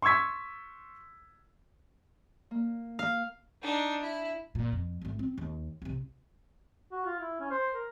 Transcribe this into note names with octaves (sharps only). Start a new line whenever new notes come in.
C6 C#6 E6 G#6 B6
A#3
F5
D4 D#4
E4
A#2
F2
G#1 D2
C4
D#2
C2 C3
F#4
F4
E4
C#4
C5
A#4